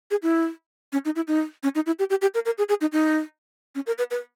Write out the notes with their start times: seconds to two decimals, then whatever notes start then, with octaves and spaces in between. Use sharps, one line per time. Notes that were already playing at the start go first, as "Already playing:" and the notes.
0.11 G#4
0.23 E4
0.93 C#4
1.05 D#4
1.16 E4
1.28 D#4
1.63 C#4
1.75 D#4
1.86 E4
1.99 G4
2.10 G4
2.22 G4
2.34 A#4
2.46 A#4
2.58 G#4
2.69 G#4
2.81 D#4
2.93 D#4
3.75 C#4
3.87 A#4
3.98 B4
4.11 B4